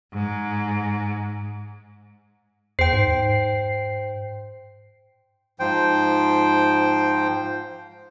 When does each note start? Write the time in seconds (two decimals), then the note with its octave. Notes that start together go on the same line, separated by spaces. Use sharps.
0.13 G#2
2.79 E2 C5 G5 C7
2.93 G#2
5.60 G#2 F3 C5 G5